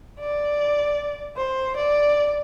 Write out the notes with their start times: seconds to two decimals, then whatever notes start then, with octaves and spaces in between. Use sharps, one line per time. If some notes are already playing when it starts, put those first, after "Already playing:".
0.20 D5
1.37 C5
1.76 D5